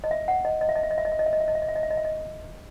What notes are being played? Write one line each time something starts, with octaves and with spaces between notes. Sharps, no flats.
D#5
E5
F#5
D#5
D#5
E5
D#5
E5
D#5
E5
D#5
E5
D#5
E5
D#5
E5
D#5
E5
D#5
E5
D#5
E5
D#5
E5
D#5